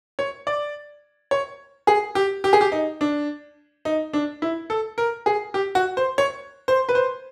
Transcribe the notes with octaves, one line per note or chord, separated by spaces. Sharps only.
C#5
D5
C#5
G#4
G4
G4
G#4
G4
D#4
D4
D#4
D4
E4
A4
A#4
G#4
G4
F#4
C5
C#5
C5
B4
C5